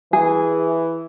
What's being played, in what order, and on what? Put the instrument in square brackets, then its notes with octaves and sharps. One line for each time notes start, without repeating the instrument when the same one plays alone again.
[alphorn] E3 [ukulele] G#4